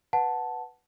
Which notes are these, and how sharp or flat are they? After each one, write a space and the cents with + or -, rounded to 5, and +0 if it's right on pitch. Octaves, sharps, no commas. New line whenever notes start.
B4 +0 F#5 +0 A5 +0